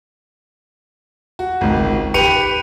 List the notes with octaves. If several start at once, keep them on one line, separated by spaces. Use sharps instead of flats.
F#4
G#1 C#2
G4 B4 G5 C#7 D#7 F7